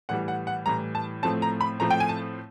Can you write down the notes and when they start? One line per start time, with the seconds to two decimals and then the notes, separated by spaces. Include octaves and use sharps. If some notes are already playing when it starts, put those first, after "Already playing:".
0.09 A2 E3 G3 F#5
0.28 F#5
0.47 F#5
0.66 A2 E3 G3 A#5
0.95 A5
1.23 A2 F3 A3 C4 A5
1.42 A#5
1.61 B5
1.80 A2 F3 A3 C4 A#5
1.91 G5
2.00 G#5
2.09 A5